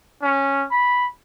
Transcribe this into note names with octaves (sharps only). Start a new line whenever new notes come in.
C#4
B5